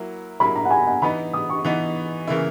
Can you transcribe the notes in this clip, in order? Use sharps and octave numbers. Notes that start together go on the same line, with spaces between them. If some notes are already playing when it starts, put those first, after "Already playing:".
Already playing: F#3 A#3 E4
F#3 A#3 E4 B5
A#5
F#5
G#5
F#5
E3 B3 D#4 B5
D#6
C#6
E3 B3 D#4
C#3 E3 A#3 E4